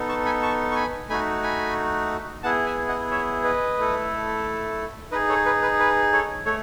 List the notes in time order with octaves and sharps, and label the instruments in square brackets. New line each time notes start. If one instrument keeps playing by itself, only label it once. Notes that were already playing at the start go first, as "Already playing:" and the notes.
Already playing: [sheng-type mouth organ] B3 D#4 A4
A5 C#6
G#5 B5
A5 C#6
C#6
G#5 B5
A3 D#4 F#4 G#5 B5
G#5 B5
B3 E4 G#4 F#5 A5
E5 G#5
D#5 F#5
C#5 E5
B4 D#5
A3 E4 A4
D#4 B4 D#5
G#4
A4 C#5
B4
B4
B4
A4 C#5
A3 A4 C#5